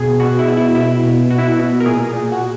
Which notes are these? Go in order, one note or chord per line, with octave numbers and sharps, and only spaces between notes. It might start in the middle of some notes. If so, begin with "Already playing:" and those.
Already playing: B2 G#4
B2 F#4
E4
B2
E4
B2 E4
B2
B2 F#4
E4
F#4
B2
A#4
A#2 G#4
A#2
F#4